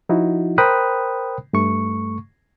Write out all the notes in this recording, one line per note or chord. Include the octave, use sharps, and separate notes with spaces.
F3 D#4 E4 F#4
A#4 C5 G5 B5 D#6 F#6
G2 A3 C#6